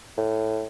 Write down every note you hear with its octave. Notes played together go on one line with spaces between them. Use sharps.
A2